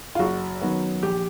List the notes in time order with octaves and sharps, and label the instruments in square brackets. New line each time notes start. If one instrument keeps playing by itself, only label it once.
[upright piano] F4
F#1 F#4
F#2 D#3 F#3 B3
A#1 G4